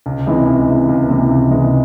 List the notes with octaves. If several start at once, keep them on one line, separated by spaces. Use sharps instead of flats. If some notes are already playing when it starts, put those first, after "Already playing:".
C#2
C3 E3 G#3
C#2
C3 E3 G#3
C#2
C3 E3 G#3
C#2
C3 E3 G#3